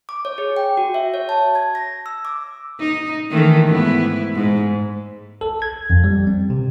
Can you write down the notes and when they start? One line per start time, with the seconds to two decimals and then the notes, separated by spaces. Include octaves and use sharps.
0.09 D6
0.25 C#5
0.38 G#4
0.56 G5
0.77 F#4
0.94 E5
1.14 C#5
1.29 A5
1.55 G#6
1.75 A#6
2.06 E6
2.25 D6
2.80 D#4
3.30 D#3 E3 A3
3.68 G#2 B3 E4
4.34 G#2
5.41 A4
5.62 G#6
5.90 F2
6.04 G3
6.27 C4
6.50 C3